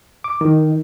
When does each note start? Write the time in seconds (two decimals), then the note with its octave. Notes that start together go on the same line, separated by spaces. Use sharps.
0.24 D6
0.41 D#3